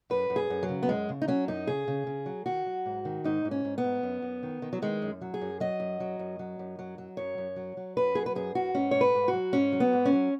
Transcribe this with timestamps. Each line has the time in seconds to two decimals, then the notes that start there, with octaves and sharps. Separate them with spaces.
0.10 F#2 B4
0.30 F#2
0.36 G#4
0.50 F#2
0.63 F#3
0.69 C#3
0.83 B3
0.89 F#2 G#3
1.09 C#3
1.22 D#4
1.28 F#3 C#4
1.48 F#2 D#4
1.67 C#3 G#4
1.88 C#3
2.07 C#3
2.26 F#3
2.46 D#3 F#4
2.66 F#3
2.86 G#2
3.05 D#3
3.24 G#2 D#4
3.45 G#2
3.51 C#4
3.65 G#2
3.78 B3
3.84 G#2
4.03 F#2
4.22 F#2
4.43 D#3
4.62 D#3
4.73 F#3
4.82 D#3 G#3
5.02 F#2
5.21 F#3
5.34 G#4
5.41 F#2
5.60 F#3 D#5
5.80 F#2
6.00 F#3
6.19 F#2
6.39 F#3
6.59 F#2
6.79 F#3
6.98 F#3
7.17 F#2 C#5
7.38 F#2
7.56 F#3
7.77 F#3
7.97 F#2 B4
8.15 F#3 G#4
8.26 B4
8.35 F#2 G#4
8.55 F#2 F#4
8.74 G#2 C#4
8.91 G#2 C#5
9.01 B4
9.15 G#2
9.28 F#4
9.33 F#3
9.53 G#2 C#4
9.72 F#3
9.80 B3
9.93 G#2
10.05 C#4
10.12 F#3